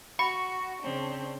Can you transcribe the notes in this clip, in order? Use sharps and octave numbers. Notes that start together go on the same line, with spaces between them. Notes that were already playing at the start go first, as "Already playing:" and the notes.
F#4 B5 C#6
C#3 C4 D4